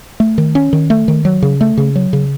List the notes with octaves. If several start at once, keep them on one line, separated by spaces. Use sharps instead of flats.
A3
D#3
C#4
D#3
A3
D#3
F#3
C#3
A3
C#3
F#3
C#3